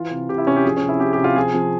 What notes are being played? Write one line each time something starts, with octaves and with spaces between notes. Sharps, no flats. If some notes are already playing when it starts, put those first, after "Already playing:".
Already playing: E3 F4
C3
C3 G4
E4
C3 C#4
G4
F3 G#4
C#4
C3
E4
F3 G4
G4
C3
F4
F3 G#4
F3